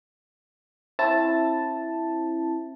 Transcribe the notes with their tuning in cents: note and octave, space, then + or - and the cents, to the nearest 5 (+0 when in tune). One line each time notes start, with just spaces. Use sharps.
C4 +40 E4 +5 A5 +0